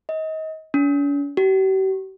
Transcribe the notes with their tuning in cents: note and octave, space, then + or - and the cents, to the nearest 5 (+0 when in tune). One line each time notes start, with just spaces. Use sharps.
D#5 +30
C#4 +45
G4 -45